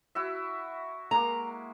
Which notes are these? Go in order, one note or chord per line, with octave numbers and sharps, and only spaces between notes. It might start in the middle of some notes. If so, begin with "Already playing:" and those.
E4 F#4 E5
G#3 A#3 A#5